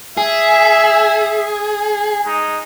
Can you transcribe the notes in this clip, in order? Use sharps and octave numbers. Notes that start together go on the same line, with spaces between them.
G#4 E5
G#3 D#4